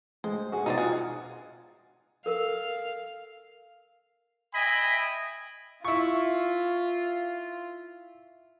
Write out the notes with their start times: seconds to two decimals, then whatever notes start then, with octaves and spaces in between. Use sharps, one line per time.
0.24 G#3 C5
0.52 F#4 G#4
0.66 B2 D#4 C5 D5
0.78 F4 G#4 F#5
2.26 A4 A#4 F5
4.54 D#5 E5 G5 G#5 B5
5.85 E4 F4 C#6